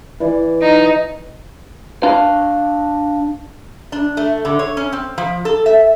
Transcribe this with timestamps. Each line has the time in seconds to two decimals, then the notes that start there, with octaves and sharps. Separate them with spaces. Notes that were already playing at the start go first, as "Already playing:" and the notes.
0.20 E3 D5
0.62 D#4
2.03 D4 F5
3.92 D4
4.17 A3
4.45 D3
4.59 C#5
4.77 C#4
4.92 C4
5.18 F3
5.45 A4
5.66 E5